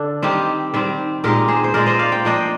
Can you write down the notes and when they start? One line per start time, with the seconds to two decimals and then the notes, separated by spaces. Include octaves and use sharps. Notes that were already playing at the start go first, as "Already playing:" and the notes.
Already playing: D3 D4
0.22 D#3 G3 C4 D#4 G4
0.74 D#3 G3 C4
1.24 A#2 G#3 D#4 G4 A#4
1.48 G#4 C5
1.64 C5
1.74 A#2 G#3 D#4 A#4 D5
1.86 C5 D#5
1.99 D5 F5
2.12 G5
2.25 F3 A#3 D4 D#5 G5